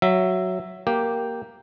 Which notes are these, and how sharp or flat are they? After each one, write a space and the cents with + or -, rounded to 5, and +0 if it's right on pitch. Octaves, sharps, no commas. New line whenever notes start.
F#3 +0 E5 +10
A#3 +0 G4 +0